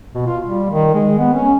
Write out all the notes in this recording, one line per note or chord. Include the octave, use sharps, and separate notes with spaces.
B2
F4
G3
D#3
G#3
B3
C#4